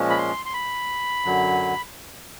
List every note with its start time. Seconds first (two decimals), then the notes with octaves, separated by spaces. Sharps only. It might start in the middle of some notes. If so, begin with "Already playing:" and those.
Already playing: A#2 F3 G#3 C#4
0.10 B5
0.18 C6
0.46 C6
0.53 B5
1.24 F#2 D3 F#3